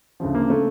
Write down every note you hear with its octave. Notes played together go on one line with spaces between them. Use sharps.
D2 C#3 F3
A#3
C#3 A3